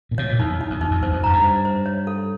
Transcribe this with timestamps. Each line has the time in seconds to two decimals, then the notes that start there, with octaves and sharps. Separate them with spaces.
0.11 A#2
0.18 B2 C#5
0.29 A#2
0.39 E2 D#4
0.61 D#4
0.70 E2
0.80 E2 D#4
0.91 F2
1.02 E2 C5
1.12 F2
1.24 F#2 A#5
1.33 G2
1.44 C5
1.65 C5
1.86 C#5
2.07 A4